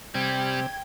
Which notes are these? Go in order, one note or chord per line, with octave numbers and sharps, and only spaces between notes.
C3 G3 G5 G#6